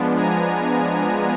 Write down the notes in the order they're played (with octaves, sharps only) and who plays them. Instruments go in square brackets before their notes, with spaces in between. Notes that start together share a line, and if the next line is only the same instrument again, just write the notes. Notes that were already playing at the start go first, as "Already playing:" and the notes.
Already playing: [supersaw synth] F3 G#3 B3 D4
G#5 A#5